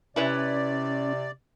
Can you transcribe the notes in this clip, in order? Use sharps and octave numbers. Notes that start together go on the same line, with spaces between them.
C3 C#4 E4 B4 C#5 D5